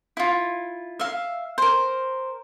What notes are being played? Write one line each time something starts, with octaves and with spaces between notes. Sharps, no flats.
E4 F4
E5 F5
A#4 C5